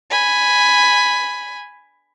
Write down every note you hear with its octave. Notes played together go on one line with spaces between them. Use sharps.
G#5 B5